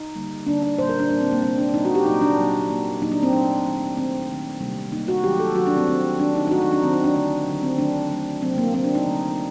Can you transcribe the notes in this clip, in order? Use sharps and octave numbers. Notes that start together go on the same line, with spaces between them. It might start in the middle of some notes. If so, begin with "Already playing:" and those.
Already playing: D#4
D3 G3 A#3
D3 G3 A#3 D4
D4
A#2 G3 A#3 C5
A#4
D4
A#2 G3 A#3 D4
C4
A#3
C3 G3 A#3 C4
D4
C3 G3 A#3 D#4
F#4
G4
A#2 F#3 A#3 D#4
D4
A#2 F#3 A#3
A#2 F#3 A#3
A#2 F#3 A#3 D#4
D4
C4
D#3 F#3 A3 D4
D#3 F#3 A3
D#3 A3 C4
D#3 A3
C3 G3 A#3
C3 G3 A#3 D#4
F#4
D#3 F#3 A3 G4
A4
D#3 F#3 A3 F#4
D4
C4
D#3 A3 C4
D#3 A3 D4
D#4
D#4
D#3 F#3 A3 F#4
D#4
D4
D#3 F#3 A3 C4
D#4
D4
D3 F#3 A3 D4
D3 F#3 A3
C4
D#3 F#3 A3 D4
D#3 F#3 A3
C3 F#3 A#3 C4
A#3
C3 F#3 A#3 C4
D4
D#4
D3 F#3 A3